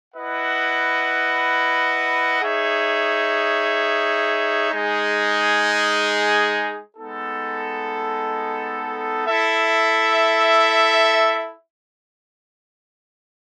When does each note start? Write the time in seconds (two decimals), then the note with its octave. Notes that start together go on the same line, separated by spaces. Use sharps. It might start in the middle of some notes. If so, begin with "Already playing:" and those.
0.14 E4 B4 D#5 F#5
2.42 D#4 G#4 C#5 E5
4.70 G#3 D#4 G#4
6.96 G#3 B3 D#4 A4
9.25 E4 A4 E5